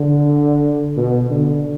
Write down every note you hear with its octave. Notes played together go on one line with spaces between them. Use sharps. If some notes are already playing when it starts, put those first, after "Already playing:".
Already playing: D3
B2
D3